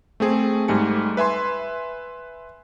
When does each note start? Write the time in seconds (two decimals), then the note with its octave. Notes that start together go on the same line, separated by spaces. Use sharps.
0.20 A3 C4 G#4
0.68 G#2 G3 A3 G#5 C#7
1.17 B4 E5 G#5 C6